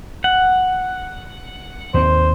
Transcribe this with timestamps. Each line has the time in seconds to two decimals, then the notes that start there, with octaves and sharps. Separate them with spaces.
0.24 F#5
1.94 D#2 C4 C5